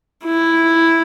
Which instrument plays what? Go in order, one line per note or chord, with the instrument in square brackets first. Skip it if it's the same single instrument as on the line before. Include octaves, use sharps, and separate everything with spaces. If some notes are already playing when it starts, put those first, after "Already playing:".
[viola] E4